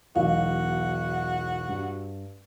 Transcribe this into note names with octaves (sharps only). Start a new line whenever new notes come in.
E1 B1 F#3 F#4 F5
G2